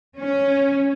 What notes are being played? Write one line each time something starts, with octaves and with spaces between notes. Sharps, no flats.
C#4